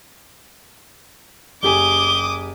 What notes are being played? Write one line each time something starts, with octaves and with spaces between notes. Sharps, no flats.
F#1 G4 G#5 D6 D#6 G7